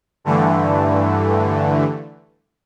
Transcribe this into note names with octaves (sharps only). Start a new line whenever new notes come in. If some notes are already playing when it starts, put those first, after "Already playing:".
G2 D3 E3 A3